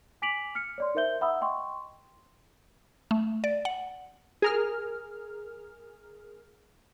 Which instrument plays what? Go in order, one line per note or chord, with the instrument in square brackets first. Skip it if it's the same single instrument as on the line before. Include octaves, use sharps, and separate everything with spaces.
[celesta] G#5 D6 B6 D7 F7 F#7
F6 C#7
C#5 D5 C6
D#4 A#4 C5 E5 G6 G7
E5 F#5 A#5 B5 D#6 E6
D#5 G5 C6 C#6
[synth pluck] A3
D5
F#5
[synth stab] G#4 A#4 F6